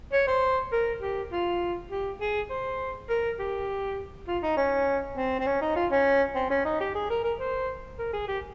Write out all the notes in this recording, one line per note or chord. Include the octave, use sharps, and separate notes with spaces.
C#5
C5
A#4
G4
F4
G4
G#4
C5
A#4
G4
F4
D#4
C#4
C4
C4
C#4
D#4
F4
C#4
C4
C#4
D#4
G4
G#4
A#4
A#4
C5
A#4
G#4
G4